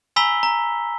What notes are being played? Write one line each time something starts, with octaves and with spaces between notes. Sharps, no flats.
G#5 A#5 B5 E6 B6 G7
A#5